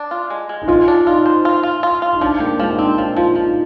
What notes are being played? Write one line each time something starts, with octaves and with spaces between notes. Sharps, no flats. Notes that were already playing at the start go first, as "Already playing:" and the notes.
Already playing: D4
F4
G#3
G#3
D#4
G#3 F4
D4
D#4 F4
C5
F4
F4
F4
F4
D#4
F3 D4
A#3 G4
F3 G#3
D#4
C4 D4
F3 D#4
F3 F4
F3 D#4